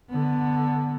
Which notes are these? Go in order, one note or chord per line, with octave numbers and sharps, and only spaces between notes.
D3 B3